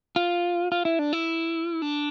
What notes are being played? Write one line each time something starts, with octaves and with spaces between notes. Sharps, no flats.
F4
F4
E4
D4
E4
D4